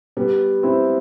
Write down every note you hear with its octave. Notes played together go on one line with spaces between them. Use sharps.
G3 B3
C4 E4